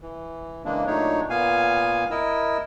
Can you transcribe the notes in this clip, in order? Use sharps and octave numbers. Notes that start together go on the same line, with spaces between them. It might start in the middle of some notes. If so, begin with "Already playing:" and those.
E3
C#3 E3 G#3 A#3 D4
A#2 F#3 A3 D4 D#4 C#5
A#2 B3 F5 G#5
E4 A#4 D#5 E6